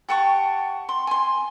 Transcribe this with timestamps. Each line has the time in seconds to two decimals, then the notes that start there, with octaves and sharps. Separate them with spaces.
0.09 G4 F#5 A5 C#6
0.89 C6
1.07 G#5 C6